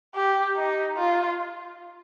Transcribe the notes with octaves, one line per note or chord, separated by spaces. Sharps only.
G4
D#4
F4